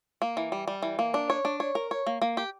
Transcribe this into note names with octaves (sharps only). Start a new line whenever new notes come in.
A#3
E3
G3
G3
E3
A#3
D4
C#5
D4
C#5
A#4
C#5
A#3
A#3
G4